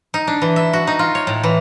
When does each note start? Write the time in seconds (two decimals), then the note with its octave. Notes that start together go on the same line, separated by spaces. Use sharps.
0.14 D#4
0.27 D4
0.42 E3
0.56 E5
0.73 F#4
0.87 D#4
0.99 F4
1.15 C#5
1.27 A2
1.44 E3